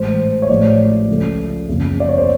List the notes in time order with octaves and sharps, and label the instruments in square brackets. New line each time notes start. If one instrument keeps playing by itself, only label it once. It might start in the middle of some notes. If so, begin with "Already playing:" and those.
Already playing: [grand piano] A1 G#2 E3 C5
C#5
A1 A2 F3 G#3 D5
C#2 C#3 F3 A3
F#1 E2 C#3 F3
D5
C#5
C5